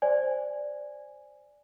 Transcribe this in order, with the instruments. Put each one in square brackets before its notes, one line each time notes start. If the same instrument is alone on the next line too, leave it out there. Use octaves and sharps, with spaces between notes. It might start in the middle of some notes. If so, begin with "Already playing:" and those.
[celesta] C5 D5 G#5